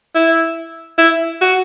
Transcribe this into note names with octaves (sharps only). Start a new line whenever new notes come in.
E4
E4
F#4